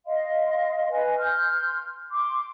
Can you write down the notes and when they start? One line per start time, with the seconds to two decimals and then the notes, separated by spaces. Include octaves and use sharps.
0.07 D#5 F5 C6
0.91 B4 D#5 F5 G#5
1.19 C6 F6 G6
2.10 C6 D6